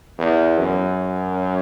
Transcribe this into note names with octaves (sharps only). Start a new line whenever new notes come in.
E2
F#2